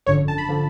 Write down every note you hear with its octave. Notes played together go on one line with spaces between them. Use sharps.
G#1 F#2 D3 F3 C#5
A5
B5
D3 F3